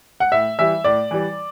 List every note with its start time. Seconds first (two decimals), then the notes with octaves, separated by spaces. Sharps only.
0.20 F#5
0.32 A2 E5
0.59 E3 G3 E5
0.84 A2 D5
1.11 E3 G3